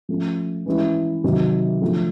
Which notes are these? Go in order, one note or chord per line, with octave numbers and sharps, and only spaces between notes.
F3 A3 C#4
E3 G#3 C#4 E4
C3 D#3 F#3
D3 F3 A3